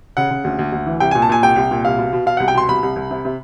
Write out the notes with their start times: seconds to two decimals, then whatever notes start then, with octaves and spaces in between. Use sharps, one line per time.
0.17 C#3 F#5
0.31 C#3
0.44 D2
0.59 D2
0.72 D2
0.86 E3
1.00 C2 G5
1.11 A#2 G#5
1.22 A5
1.29 A#2 G#5
1.42 C2 G5
1.56 C2
1.71 A#2
1.85 C2 F5
1.98 B2
2.13 B2
2.26 B2 F5
2.37 C2 F#5
2.48 G5
2.55 B2 C6
2.68 C2 B5
2.83 C2
2.96 C2
3.11 C3
3.25 C3